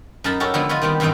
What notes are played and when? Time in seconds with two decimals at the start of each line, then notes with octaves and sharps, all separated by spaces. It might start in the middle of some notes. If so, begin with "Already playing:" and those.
0.24 F#2 D#4 A#4 A5 B5
0.40 C#4 F#4 G4 A4 A#4
0.54 D3 F3 G#3 B3 D#4 E4
0.69 B3 F4 F#4 D#5
0.82 D#3 G3 B3 C4 G4
1.00 G2 D#3 E3 B3 C4 D#4